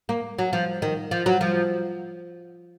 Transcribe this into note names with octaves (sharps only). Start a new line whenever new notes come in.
A#3
F#3
F3
D#3
F3
F#3
F3